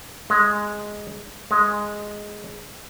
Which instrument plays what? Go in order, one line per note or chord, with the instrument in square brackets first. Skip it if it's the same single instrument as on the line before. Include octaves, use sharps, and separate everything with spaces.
[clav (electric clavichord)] G#3
G#3